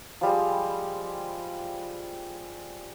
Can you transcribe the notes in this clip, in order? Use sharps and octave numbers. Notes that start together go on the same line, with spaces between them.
F3 G3 G#3